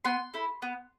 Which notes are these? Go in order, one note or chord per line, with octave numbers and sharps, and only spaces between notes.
B3 C6
E4 A4
B3